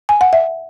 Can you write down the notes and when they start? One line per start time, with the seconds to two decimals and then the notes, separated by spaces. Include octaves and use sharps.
0.09 G#5
0.21 F#5
0.33 E5